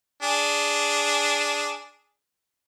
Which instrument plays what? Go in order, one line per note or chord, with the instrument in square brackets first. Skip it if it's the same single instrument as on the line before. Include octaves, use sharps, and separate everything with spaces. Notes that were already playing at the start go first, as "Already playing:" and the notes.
[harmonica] D4 G#4